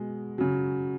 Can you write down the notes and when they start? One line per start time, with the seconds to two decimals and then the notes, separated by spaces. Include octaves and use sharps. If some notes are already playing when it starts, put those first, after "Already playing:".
Already playing: B2 G#3
0.38 C#3 F#3